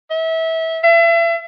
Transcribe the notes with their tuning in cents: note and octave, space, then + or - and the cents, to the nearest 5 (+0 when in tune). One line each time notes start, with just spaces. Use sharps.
E5 -25
E5 +35